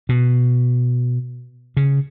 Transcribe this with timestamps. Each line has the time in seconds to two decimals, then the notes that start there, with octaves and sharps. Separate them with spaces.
0.09 B2
1.77 C#3